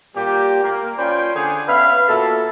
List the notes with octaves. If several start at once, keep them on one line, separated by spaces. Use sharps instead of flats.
A#2 G3 A#3 G4
A#3
C#4 F4 C5 D5 G5 B5
D3 D4 G#4
B3 C#4 B4 E5 F5
A#2 F#4 A4 E5 A5 B5